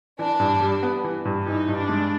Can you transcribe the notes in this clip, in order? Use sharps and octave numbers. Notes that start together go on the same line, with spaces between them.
E3 D4
G2
G3
B3
E3
G2
E3 D#4
G2
D4
G#3